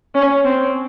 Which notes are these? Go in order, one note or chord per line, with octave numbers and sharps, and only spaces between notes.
C#4
C4